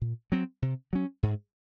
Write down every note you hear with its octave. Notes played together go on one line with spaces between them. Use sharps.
A#2
F#3 C4
C3
F#3 C#4
G#2